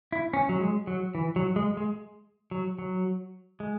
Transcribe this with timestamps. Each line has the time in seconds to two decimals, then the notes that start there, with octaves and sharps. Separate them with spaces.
0.12 E4
0.34 C#4
0.49 F#3
0.61 G#3
0.87 F#3
1.15 E3
1.36 F#3
1.56 G#3
1.77 G#3
2.51 F#3
2.79 F#3
3.60 G#3